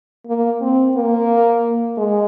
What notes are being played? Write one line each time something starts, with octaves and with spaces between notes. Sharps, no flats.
A#3
C4
A#3
G#3